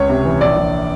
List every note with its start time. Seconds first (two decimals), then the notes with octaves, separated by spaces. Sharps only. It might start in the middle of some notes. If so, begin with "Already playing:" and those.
Already playing: C#2 C#5
0.09 C3
0.25 E3
0.41 A#1 D5
0.57 A#1